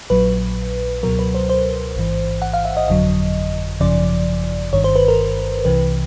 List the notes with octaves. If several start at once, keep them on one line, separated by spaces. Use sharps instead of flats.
A#1 A#2 F#3 B4
C#2 B2 F#3 A#4
B4
C5
C5
A1 G#2 E3
F#5
F5
E5
D#5
G1 F2 D3 F#3 D#5
G#1 F#2 C#3 F3 D5
G1 G2 D#3 C#5
C5
B4
A#4
C2 C3 E3 B4